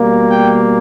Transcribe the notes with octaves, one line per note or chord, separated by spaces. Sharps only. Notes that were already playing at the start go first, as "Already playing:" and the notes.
Already playing: B2 G3 A#3
G5